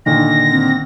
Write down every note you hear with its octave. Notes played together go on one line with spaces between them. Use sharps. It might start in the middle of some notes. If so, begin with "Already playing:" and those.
A#2 D3 D#3 A#6
C4